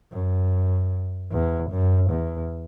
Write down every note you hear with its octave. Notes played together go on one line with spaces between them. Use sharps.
F#2
E2
F#2
E2